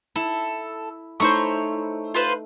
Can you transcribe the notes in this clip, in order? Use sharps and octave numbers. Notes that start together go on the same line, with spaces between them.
E4 A4
A3 D#4 E4 C5 C#5 C#6
F4 B4 C5